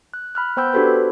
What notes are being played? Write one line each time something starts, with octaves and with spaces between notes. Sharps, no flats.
F#6
B5 F6 F#6
B3 C5 G5 B5 E6 G6
D4 F#4 G4 A4 B4 C5